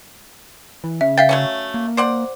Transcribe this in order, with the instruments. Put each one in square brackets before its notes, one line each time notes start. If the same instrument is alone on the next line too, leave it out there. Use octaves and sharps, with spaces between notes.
[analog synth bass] E3
[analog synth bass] C#3 [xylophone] E5
[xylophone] E5 F5 A6 [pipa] G5
[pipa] F#3 A3 C#4
[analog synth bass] A#3
[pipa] C5 D5 F#5